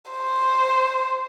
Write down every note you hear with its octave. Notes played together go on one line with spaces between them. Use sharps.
C5